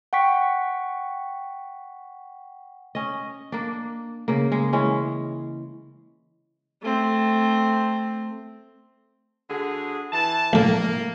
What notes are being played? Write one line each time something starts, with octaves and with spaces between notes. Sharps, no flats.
F#5 G5 C#6 B6
C#4 D#5
A#3 D4
C#3 A#3
G#3
E3 G#3 C#4
A3 C4
D3 F#4 G#4
E3 A5
A#1 A2 D3 A#3